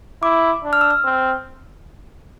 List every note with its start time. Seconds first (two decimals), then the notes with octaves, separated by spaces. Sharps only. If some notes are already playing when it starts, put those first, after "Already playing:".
0.23 E4 D6
0.64 D4
0.73 F6
0.81 E6
0.90 F6
1.05 C4